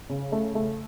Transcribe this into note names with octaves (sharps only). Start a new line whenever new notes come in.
C#3
A3
A3